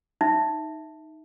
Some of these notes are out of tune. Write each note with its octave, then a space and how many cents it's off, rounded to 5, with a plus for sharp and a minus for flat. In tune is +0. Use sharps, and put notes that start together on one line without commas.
D#4 +0 E5 +0